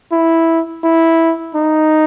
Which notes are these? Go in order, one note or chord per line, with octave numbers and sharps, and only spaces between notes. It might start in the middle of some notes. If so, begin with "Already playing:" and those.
E4
E4
D#4